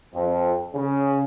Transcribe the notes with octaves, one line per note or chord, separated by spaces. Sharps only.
F2
C#3